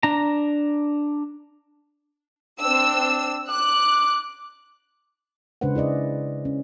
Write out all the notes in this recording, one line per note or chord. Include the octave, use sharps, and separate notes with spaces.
D4 A#5
C4 D4 E6
D6 F#6
C#3 G#3 D4 B4 C5 F#5
E4 G#4 D5 D#5
C#4